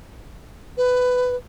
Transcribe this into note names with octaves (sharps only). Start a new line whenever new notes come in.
B4